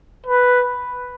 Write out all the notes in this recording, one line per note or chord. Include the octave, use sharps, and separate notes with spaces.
B4